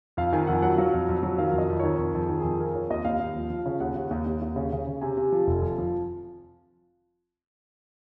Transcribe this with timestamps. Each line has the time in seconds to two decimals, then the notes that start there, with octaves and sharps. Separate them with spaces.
0.17 F2 F5
0.33 D#3 G#5
0.47 F2 F#5
0.62 F#3 F#5
0.78 F#3 F5
0.94 F2
1.09 F2
1.23 F#3
1.38 D#3 F5
1.53 F2 D#5
1.69 F2
1.80 D#3 C#5
1.99 F2
2.14 F2
2.20 G#4
2.29 D#3
2.40 F2 G#4
2.60 F3 A#4
2.75 F3 C#5
2.90 D#2 D#5
3.05 D#2 F5
3.20 D#2
3.36 F3
3.50 F3
3.66 C#3
3.80 D#2 F#5
3.95 D#2
4.11 D#2
4.26 D#2
4.42 D#2
4.56 C#3
4.72 C#3
4.87 C#3
5.01 C3 G#5
5.17 C3
5.32 F3
5.47 F1
5.62 F3
5.78 F3